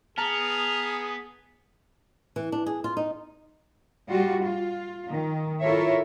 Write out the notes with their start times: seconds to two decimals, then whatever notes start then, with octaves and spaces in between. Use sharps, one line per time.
0.18 B3 G#4 A5 A#5 F6
2.36 E3
2.52 D4
2.66 G#4
2.84 F4
2.97 D#4
4.08 G3 F4 F#4
4.42 F4
5.07 D#3
5.61 E4 F4 A4 A#4 C#5 E5